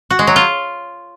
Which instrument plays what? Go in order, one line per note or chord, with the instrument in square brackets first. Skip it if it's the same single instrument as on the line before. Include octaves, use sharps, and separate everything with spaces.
[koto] F#4
G#3
F#3
F4